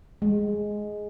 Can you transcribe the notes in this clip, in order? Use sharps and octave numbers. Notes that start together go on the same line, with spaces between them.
G#3